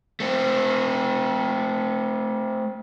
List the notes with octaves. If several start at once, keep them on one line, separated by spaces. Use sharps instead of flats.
A3 C4